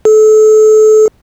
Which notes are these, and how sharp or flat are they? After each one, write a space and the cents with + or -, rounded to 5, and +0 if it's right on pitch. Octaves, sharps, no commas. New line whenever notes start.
A4 -30